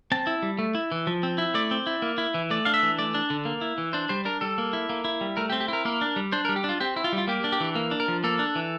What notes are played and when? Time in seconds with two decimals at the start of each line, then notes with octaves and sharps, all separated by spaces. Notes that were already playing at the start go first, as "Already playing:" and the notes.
0.12 C4 A5
0.27 E4
0.43 G3
0.59 A3
0.75 E4
0.92 E3
1.07 F3
1.23 C4
1.38 E4
1.54 A3 D5
1.71 C4
1.87 E4
2.02 A#3
2.18 E4
2.34 E3
2.50 A3 D5
2.65 D4 F5
2.74 E5
2.83 E3
2.99 A3 D5
3.14 D4
3.30 D3
3.45 A#3
3.61 E4
3.78 E3
3.93 D4 C5
4.09 G3 C5
4.25 D4 A#4
4.41 G3 A4
4.58 A#3
4.73 E4
4.90 A#3
5.05 E4
5.21 G3
5.37 A3 A#4
5.50 G4
5.52 C4
5.60 G4
5.68 E4 A#4
5.85 A#3 A#4
6.01 D4
6.16 G3
6.32 D4 C5
6.45 A#4
6.49 G3
6.56 G4
6.64 D4
6.69 F4
6.80 C4 G4
6.96 E4
7.04 F4
7.13 G3
7.18 F4
7.28 A#3 G4
7.44 D4
7.52 G4
7.60 E3
7.75 A#3
7.91 D4
8.00 A#4
8.08 F3
8.24 A#3 A4
8.39 D4
8.55 E3